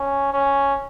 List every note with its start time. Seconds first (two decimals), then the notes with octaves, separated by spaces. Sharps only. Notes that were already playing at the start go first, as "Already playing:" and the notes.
Already playing: C#4
0.33 C#4